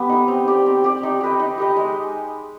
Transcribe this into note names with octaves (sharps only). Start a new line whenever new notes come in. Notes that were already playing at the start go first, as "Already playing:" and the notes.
Already playing: B3 G4
D#4 B4
C4
G4 D5
C4
G4 D5
D#4
G4 B4 D#5
D#4
G4 B4 D#5
G#3